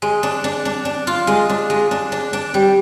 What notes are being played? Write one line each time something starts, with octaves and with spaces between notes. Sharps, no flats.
G#3
D4
D4
D4
D4
F4
G#3
D4
G#3
D4
D4
D4
G3